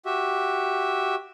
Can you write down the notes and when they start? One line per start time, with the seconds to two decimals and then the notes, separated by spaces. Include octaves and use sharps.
0.06 F#4 G4 E5